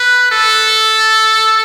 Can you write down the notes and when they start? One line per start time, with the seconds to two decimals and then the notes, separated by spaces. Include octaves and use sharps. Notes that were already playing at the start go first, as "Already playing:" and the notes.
Already playing: B4
0.31 A4